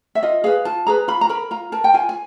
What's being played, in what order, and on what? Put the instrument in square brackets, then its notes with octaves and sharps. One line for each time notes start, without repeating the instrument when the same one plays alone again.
[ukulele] E5
F4 D#5
G#4 B4 F5
F4 A5
G#4 B4 A#5
F4 B5
A#5
A#4 B5
F4 A#5
A#4 A5
G5
F4 G#5
G#5